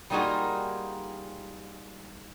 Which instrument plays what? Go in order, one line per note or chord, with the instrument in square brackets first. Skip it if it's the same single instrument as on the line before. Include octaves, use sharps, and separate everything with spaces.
[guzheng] G3 A#3 D#4 F4 F#4 G#4